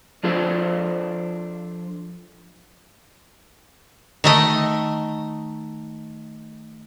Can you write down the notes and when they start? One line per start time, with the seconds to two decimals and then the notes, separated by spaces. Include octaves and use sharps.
0.23 F3 D4 F4 A4 C5
4.24 D#3 A3 D#5